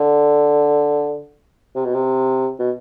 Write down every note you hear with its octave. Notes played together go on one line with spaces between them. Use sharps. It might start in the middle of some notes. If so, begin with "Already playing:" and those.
Already playing: D3
C3
B2
C3
B2